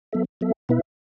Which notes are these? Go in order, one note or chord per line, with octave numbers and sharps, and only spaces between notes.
F#3 B3 A4 E5
F#3 B3 A4 E5
B2 B3 E4 B4 E5